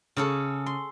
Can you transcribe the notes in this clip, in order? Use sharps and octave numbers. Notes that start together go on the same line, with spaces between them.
C#3 C#4 A4
C6